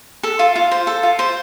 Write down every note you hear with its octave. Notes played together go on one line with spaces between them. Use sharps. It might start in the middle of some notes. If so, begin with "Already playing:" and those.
A4
F4
F4
C5
A4
F4
C5